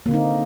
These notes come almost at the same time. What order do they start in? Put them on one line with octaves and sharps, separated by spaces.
A#3 D3 C4 D#4